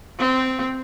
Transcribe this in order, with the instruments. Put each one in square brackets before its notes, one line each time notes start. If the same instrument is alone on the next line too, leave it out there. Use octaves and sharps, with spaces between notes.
[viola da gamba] C4